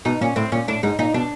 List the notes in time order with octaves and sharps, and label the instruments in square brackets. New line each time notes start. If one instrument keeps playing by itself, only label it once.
[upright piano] B2 [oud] D#4
[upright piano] A#2 [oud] C#4
[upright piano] A2 [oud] C4
[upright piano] A#2 [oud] C#4
[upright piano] A2 [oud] D4
[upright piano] G#2 [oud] D#4
[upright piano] A#2 [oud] D#4
[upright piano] B2 [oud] D4